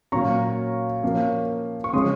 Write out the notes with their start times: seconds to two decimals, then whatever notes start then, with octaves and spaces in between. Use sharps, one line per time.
0.12 A#2 F#3 C#4 A#5 C#6
1.03 F3 A#3 C#4
1.84 C#6
1.93 C#3 F3 G#3 C#4 C6 D#6